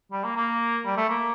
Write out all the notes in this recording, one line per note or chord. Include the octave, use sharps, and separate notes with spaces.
G3
A#3
A#3
G3
A3
A#3